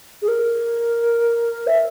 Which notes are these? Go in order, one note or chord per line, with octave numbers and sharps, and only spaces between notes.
G#4
A#4
E5